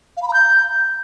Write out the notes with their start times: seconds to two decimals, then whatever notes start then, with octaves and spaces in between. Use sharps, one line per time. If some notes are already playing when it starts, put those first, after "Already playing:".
0.17 F5
0.22 B5
0.28 A#5
0.33 G6